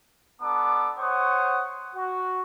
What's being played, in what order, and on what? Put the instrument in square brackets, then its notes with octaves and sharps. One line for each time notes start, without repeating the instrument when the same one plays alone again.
[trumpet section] B3 D4 A4 A#5 D6
C5 C#5 F#5 C#6 D#6
F#4